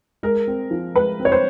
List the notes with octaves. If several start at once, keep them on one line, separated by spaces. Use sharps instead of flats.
G#3 A#4
C4
F3
G#3 B4
C4
C#5
C5